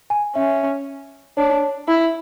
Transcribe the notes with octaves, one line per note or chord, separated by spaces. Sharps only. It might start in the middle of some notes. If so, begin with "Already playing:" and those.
G#5
C#4 E5
D4 C#5
E4